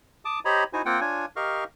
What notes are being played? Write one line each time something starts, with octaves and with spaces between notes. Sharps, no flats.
A5 D6 D#6
G4 C5 C#5 D#5 A#5 B5
D#4 E4 F#4 C5 G#5
A#3 C4 F4 F#5 G5
D4 F4 C#5 G#5
G4 A#4 D#5 F5 C#6 F6